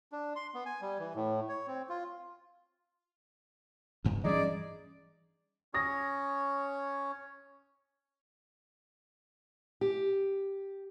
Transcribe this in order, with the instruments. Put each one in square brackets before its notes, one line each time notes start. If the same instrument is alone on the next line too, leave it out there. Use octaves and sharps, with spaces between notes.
[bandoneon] D4
C6
B3
G#5
G3
E3
A2
C#5
C4
F4
[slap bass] D2 G2
[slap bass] E3 G3 C#4 [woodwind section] D#4 G#4 D5
[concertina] C#4 C#5 [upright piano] D#6 A#6
[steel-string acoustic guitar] G4